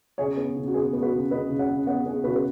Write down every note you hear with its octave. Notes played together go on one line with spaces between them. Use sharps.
C#3 G#4 C#5
B3
C#3
F#4
B3 G#4
B3
F#4 B4
C#3
C#3 B4 D#5
C#3
C#5 F#5
C#3
B3 C#5 F#5
B3 G#4
C#3 F#4 B4
B4